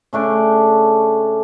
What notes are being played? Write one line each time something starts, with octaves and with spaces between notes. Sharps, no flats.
C#3 A3 D4 D6